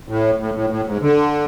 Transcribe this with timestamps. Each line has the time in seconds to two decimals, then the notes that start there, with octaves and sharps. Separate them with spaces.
0.09 A2
0.40 A2
0.55 A2
0.70 A2
0.87 G#2
1.02 D3